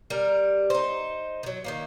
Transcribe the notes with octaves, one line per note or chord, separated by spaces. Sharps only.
G3 A#4
D#4 C5
D#3 F#3
D#3 E3 A#3